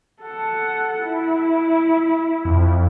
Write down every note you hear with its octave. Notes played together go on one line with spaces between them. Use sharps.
A4 F#5
E4
F2